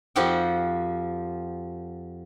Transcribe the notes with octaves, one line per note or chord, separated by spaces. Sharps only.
F2 F3 F#4 G4 F#5 G5